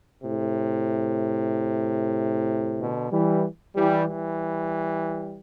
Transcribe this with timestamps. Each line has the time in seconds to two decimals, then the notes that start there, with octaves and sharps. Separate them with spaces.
0.23 A2 C3
2.80 B2 D3
3.11 E3 G3
3.76 E3 G3
4.08 E3 G3